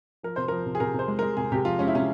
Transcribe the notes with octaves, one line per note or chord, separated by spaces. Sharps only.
F3 A#4
C3 C5
F3 A#4
C3
G#4
C3 A#4
C3 C5
G#3
G#3 A#4
C3 G#4
C3 G4
F3 F4
G#3 C#4
E4
C3 C#4